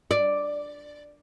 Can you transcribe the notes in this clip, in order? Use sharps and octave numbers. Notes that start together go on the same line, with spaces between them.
D5